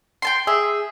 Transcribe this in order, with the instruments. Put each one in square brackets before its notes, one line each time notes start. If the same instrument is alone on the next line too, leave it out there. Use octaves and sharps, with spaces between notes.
[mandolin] G5 A5 C6 [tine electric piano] C7
[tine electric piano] G#4 [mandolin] E5